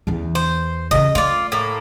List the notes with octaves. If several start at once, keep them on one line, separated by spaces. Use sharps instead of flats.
E2 E3
C5
C#3 F#3 D#5
A3 F4 D5
A2 A#3